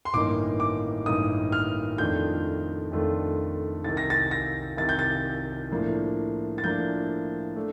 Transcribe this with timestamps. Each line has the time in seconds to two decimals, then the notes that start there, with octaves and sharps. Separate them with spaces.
0.05 C6
0.14 A1 G2 D#3 A#3 D#4 D6
0.60 D6
1.06 A1 G2 D#3 A#3 D#4 D#6
1.52 F6
1.98 F2 D#3 A3 D4 F4 G6
2.92 F2 D#3 A3 D4 F4
3.84 C2 C3 D#3 A6
3.97 A#6
4.10 A6
4.31 A#6
4.77 C2 C3 D#3 A6
4.89 G6
4.99 A6
5.71 A2 F3 A#3 D4
6.58 A6
6.63 A2 F3 A#3 D4 G6
7.56 A3 D4